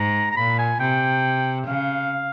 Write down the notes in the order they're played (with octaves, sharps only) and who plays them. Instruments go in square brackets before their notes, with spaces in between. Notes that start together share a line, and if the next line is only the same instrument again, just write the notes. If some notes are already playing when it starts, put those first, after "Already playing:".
Already playing: [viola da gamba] G#2 [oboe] A#5
[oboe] A#5
[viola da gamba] A#2 [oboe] B5
[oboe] G#5
[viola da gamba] C3 [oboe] G5
[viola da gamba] C#3 [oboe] F5